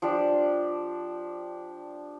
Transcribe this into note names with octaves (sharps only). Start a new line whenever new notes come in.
F3 D4 G4 D5